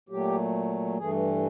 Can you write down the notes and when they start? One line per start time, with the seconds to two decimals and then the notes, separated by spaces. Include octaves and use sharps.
0.09 A#2 F#3 A3 G4
0.98 G2 E3 A3 G#4